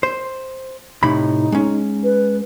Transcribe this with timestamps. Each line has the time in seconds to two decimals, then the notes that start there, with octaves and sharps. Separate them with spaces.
0.03 C5
1.03 A2 C3 D#4 B5
1.52 G#3 C#4
2.04 B4